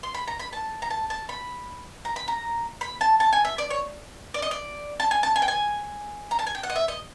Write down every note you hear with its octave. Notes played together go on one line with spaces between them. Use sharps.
C6
B5
A#5
B5
A5
A#5
A5
A5
B5
A#5
B5
A#5
B5
A5
A5
G#5
E5
D5
C#5
D5
D#5
D5
A5
G#5
A5
G#5
G5
G#5
A#5
A5
G#5
G5
F#5
D#5
E5
D#5